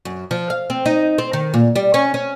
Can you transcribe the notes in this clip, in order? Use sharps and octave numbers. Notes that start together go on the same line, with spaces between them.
F#2
F3
F5
C4
D#4
C4
D#3
A#2
G3
C#4
C#4